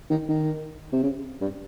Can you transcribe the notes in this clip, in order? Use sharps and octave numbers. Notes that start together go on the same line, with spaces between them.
D#3
D#3
C3
C#3
G2